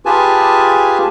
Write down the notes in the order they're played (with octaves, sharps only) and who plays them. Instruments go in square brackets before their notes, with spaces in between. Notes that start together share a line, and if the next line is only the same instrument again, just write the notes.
[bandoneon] F4 G4 G#4 B4 G#5 A5